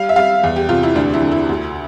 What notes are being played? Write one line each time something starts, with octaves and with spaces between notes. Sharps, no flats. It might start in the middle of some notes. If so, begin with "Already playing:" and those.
Already playing: G3 F5
E5
G3 F5
E2
G4
C3 F4
E4
D2 D4
E4
D3
E4
D2